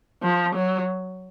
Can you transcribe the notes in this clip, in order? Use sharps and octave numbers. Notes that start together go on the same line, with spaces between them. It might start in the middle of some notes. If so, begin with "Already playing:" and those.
F3
F#3